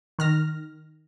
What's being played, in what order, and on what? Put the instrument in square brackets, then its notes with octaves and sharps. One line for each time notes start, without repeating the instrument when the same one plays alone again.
[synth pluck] D#3 F6 A#6